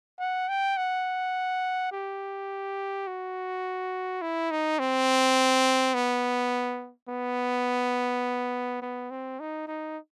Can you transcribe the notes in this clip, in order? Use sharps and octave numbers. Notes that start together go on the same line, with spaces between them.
F#5
G5
F#5
G4
F#4
E4
D#4
C4
B3
B3
B3
C4
D#4
D#4